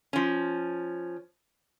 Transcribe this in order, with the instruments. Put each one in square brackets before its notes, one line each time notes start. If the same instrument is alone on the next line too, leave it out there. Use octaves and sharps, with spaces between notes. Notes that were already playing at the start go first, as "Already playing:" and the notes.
[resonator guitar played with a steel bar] F3 C#4